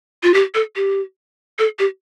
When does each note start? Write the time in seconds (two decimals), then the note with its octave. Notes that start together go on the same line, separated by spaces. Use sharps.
0.23 F4
0.34 G4
0.55 A4
0.76 G4
1.59 A4
1.79 G4